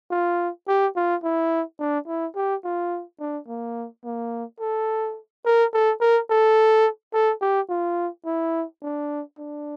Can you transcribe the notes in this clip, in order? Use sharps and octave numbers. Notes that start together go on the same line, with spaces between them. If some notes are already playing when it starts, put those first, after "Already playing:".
F4
G4
F4
E4
D4
E4
G4
F4
D4
A#3
A#3
A4
A#4
A4
A#4
A4
A4
G4
F4
E4
D4
D4